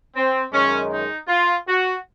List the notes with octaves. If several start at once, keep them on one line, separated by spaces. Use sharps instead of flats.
C4
F#2 D#3 G#3 C#4
D#4
F4
F#4